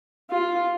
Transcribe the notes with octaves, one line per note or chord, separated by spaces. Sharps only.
F4